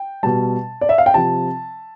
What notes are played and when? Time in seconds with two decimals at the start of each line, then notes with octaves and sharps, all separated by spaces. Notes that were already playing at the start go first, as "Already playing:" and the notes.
Already playing: G5
0.23 B2 G3 A5
0.81 D5
0.89 E5
0.98 F5
1.06 G5
1.14 C3 F3 A5